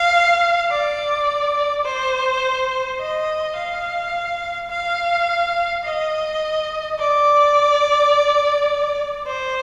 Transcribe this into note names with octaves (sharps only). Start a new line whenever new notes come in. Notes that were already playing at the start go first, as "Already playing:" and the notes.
Already playing: F5
D5
C5
D#5
F5
F5
D#5
D5
C5